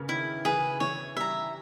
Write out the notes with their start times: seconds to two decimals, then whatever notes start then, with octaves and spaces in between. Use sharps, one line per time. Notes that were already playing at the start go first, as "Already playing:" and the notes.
Already playing: C#3 A#3 B3 C#4
0.08 D#3 E4
0.45 E3 G#4 B4
0.80 E3 C#5
1.16 G3 E5 A#5